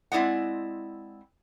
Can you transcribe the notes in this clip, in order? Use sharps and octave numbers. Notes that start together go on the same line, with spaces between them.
G#3 C4 E4 D5 D#5 F#5